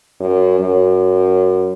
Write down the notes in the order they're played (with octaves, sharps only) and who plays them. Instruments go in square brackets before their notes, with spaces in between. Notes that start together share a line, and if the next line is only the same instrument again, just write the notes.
[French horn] F#2
F#2